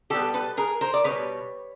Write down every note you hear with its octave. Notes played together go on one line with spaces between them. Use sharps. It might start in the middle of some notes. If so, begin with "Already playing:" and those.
B2 G3 B3 G4 A4
A4 B4
G#4 A#4
A#4 C5
D5
B2 G3 B3 B4 C#5